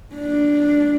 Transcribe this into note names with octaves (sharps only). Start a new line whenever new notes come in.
D4